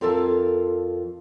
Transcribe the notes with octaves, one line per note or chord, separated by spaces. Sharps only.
F2 F4 A4 A#4 E5 A5